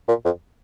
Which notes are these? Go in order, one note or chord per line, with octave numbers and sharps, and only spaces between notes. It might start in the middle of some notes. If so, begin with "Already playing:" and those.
A#2
F2